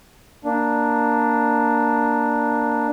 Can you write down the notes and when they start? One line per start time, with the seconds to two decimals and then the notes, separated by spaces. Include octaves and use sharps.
0.45 A#3 D4